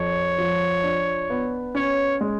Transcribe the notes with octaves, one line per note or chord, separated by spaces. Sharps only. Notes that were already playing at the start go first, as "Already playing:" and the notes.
Already playing: F2 C#5
F3
D4
B3
C#4 C#5
G#3